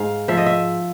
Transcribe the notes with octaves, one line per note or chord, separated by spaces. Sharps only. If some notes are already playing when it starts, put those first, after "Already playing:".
Already playing: G#2 F5
F3 E5
D#5
E5